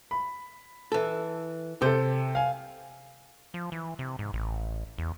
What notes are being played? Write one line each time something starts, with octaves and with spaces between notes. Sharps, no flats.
B5
E3 A4
C3 A4 C5
F5 G#5
F3
E3
C3
G#2
A1
E2